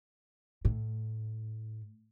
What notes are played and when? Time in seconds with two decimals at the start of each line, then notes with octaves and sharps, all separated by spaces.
0.65 A2